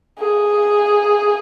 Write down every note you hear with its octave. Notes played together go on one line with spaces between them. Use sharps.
G#4